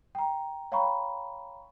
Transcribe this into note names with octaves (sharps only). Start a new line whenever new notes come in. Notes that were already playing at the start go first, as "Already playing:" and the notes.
G5 A#5
C#5 F5 G5 A#5 B5 C#6